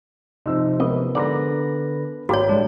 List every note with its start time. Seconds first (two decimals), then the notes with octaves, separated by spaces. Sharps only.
0.46 C3 F3 D#4 E6
0.80 E3 B3 A#4 D#5
1.15 G#2 D3 B4 D5 A#6
2.29 G#1 A#3 F#4 G4 C#5
2.49 A2 G3 A3 D4